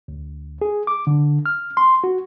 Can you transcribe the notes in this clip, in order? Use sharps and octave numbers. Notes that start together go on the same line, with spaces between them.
D2
G#4
D6
D3
F6
C6
F#4